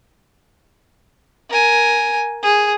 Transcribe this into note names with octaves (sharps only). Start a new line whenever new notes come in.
A#4 G#5
G#4